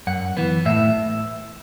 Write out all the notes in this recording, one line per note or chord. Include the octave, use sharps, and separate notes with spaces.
F#2 F#5
E3 B3
A2 E5